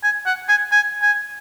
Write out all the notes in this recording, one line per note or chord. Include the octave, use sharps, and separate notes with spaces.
G#5
F#5
G#5
G#5
G#5